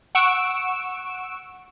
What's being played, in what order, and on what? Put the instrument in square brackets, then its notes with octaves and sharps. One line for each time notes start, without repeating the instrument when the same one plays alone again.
[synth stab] F#5 C#6 E6 D7 E7